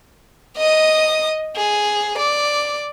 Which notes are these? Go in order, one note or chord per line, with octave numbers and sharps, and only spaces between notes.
D#5 D#6
G#4
D5